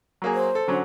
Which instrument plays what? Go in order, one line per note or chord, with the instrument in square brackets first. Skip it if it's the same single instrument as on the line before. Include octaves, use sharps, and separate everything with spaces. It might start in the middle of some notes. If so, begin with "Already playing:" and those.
[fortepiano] F#3 A#3 G#4
[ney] C5
[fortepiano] A4
D3 F#3 C#4